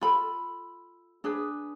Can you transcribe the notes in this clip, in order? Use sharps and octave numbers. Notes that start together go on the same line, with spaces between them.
F4 A4 B5
D4 G#4 B4